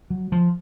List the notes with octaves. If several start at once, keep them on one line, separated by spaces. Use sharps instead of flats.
F#3
F3